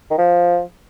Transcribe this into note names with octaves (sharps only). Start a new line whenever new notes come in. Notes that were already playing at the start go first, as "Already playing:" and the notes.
D#3
F3